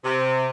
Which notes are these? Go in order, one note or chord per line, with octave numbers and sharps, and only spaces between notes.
C3